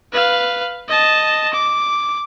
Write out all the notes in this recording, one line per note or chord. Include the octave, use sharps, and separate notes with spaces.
B4 F5
D#5 A5
D6